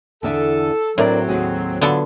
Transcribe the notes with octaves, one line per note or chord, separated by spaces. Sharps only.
E2 D3 A4 E5
A2 F#3 C4 D4 A#4 D5
D#2 F#4 G#4
D3 F#3 B3 F4 A4